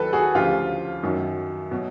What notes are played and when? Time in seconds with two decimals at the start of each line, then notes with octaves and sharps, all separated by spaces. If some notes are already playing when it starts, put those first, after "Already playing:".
Already playing: D#2 D#3 F#3 A4 B4
0.13 F#4 G#4
0.35 D2 C#3 F3 F4 G4
1.03 F#2 D#3 F#3
1.71 B2 F#3